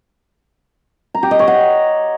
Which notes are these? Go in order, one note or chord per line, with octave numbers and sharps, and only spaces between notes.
A#5
G4
D#5
C#5
F#5